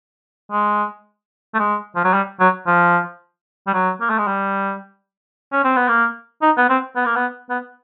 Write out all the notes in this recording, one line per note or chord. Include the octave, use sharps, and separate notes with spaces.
G#3
A3
G#3
F3
F#3
G3
F#3
F3
G3
F#3
A#3
A3
G#3
G3
C#4
C4
B3
A#3
D#4
B3
C4
B3
A#3
B3
B3